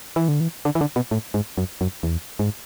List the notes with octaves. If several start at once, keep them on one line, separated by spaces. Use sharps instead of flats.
E3
D3
E3
D3
E3
D3
B2
A2
G#2
F#2
F#2
E2
G#2